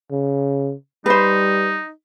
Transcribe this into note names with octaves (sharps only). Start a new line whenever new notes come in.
C#3
G3 D#4 B4 C5